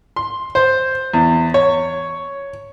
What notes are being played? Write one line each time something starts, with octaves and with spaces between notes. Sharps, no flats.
C6
C5
E2
C#5